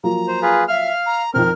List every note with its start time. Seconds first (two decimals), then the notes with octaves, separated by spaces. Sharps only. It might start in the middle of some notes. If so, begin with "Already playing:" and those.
0.04 F3 F#3 A#3 A#5
0.28 C5
0.42 F4 G#4 B4
0.68 E5 F5 F6
1.06 A#5
1.34 F2 D#3 C4 A#4 F6